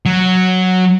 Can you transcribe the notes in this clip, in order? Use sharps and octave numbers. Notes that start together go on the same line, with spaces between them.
F#3